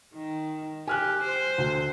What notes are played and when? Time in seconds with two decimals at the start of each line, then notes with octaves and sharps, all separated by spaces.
0.15 D#3
0.88 G4 G#5 F6 F#6
1.23 C5
1.58 D2